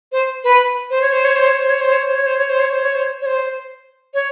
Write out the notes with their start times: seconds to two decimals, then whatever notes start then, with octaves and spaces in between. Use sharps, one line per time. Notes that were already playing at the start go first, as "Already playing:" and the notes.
0.12 C5
0.44 B4
0.90 C5
1.02 C#5
1.12 C5
1.24 C#5
1.36 C5
1.46 C#5
1.59 C5
1.69 C#5
1.81 C5
1.92 C#5
2.03 C5
2.15 C#5
2.26 C5
2.38 C#5
2.49 C5
2.60 C#5
2.72 C5
2.83 C#5
2.95 C5
3.21 C#5
3.26 C5
4.14 C#5